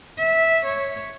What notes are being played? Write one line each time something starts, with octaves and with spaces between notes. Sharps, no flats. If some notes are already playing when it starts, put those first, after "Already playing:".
E5
C#5